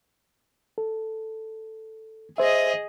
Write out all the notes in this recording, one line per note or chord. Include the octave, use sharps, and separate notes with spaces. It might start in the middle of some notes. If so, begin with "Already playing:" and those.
A4
G#4 C5 D#5 E5